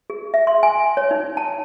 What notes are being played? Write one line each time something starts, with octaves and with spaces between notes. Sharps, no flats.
G#4
E5
C6
G#5
C#5
D#4
A5